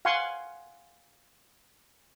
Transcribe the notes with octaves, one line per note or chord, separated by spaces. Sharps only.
F5 F#5 G#5 C6 C#6